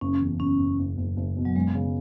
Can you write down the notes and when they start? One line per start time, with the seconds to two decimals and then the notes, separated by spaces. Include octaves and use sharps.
0.01 F#1 C#4
0.21 E2
0.40 F#1 C#4
0.59 F#1
0.79 F#1
0.97 F#1
1.17 F#1
1.37 B2
1.45 F#3
1.56 F#2 G#3
1.75 C#3